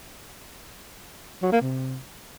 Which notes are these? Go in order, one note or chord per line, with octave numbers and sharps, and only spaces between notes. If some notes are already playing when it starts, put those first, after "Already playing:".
F#3
A#3
C3